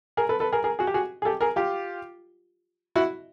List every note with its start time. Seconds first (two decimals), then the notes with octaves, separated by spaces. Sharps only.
0.17 G#4 A#4
0.29 A4 B4
0.40 A4 B4
0.52 G#4 A#4
0.64 G#4 A#4
0.79 F#4 G#4
0.87 G4
0.94 F#4 G#4
1.22 G#4
1.25 G4 A4
1.41 G#4 A#4
1.56 F4 G4
2.96 E4 F#4